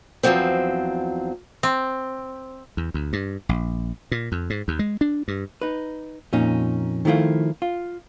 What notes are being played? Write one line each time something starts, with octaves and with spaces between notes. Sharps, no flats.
E2 A2 F3 F#3 C4
C4
E2
D2
G2
A#1
A#2
F2
G#2
D#2
G#3
D4
G2
D#4 B4
F2 A#2 C#4 D#4
D#3 F3 A3 E4 F4
F4